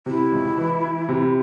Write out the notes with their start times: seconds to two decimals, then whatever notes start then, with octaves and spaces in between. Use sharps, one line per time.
0.06 C3 E4
0.32 C#2
0.57 E3
0.84 E3
1.09 C3